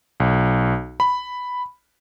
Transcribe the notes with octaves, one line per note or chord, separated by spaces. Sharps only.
B1
B5